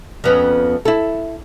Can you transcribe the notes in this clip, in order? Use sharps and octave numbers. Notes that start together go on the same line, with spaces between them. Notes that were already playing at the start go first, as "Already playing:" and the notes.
F2 B3 C#4
E4 A4